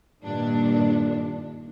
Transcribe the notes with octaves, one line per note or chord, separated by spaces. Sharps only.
G2 A#2 D#3 D4